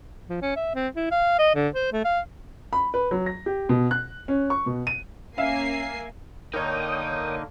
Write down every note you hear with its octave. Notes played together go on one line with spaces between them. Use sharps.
F3
C#4
E5
C4
E4
F5
D#5
D3
C5
A3
F5
B5
B4
F#3
A#6
G4
B2
F#6
C#4
C#6
B2
D#7
A#3 C#4 E5 F5 G#5 C7
D3 A#3 D#4 A#4 C#5 D#5 G5 D#6